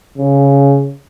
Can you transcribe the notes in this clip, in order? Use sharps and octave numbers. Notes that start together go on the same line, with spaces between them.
C#3